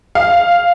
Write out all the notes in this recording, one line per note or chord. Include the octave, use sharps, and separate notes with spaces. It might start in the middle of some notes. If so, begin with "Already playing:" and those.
F5